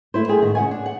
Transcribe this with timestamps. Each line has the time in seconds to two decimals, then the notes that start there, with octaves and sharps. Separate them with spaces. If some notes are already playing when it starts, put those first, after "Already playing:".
0.14 A3 E4 C5
0.28 G3 A3 G4 G#4
0.42 G#2 D#3
0.55 C#3 F#5 G#5
0.71 D4
0.86 F#5